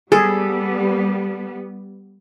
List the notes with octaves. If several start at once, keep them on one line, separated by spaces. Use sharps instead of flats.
G3 B3 G#4 A4